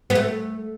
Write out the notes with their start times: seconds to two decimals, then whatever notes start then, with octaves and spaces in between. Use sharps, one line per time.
0.10 B3
0.15 A3